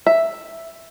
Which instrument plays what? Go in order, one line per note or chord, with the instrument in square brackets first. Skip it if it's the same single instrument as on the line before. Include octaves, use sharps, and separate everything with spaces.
[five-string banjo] E5